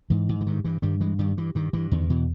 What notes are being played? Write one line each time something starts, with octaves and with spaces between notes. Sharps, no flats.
G#2 E3
G#2
E3
G2 D#3
G2 E3
G2 D#3 G3
G2 E3 G#3
G2 D#3 G3
G2 E3
G2 D#3
G2 E3
E2 D#3
B2 E3